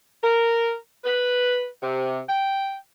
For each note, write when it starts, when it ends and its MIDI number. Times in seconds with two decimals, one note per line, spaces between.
0.23 0.74 70
1.04 1.66 71
1.82 2.20 48
2.29 2.75 79